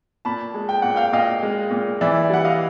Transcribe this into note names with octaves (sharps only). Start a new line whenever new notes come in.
A#2 A5 B5
G#3
G5
A#2 F#5
F5 G5
A#2 D#5 F5
G#3
A#2
E3 D5 E5
G3 F#5
D#5 F5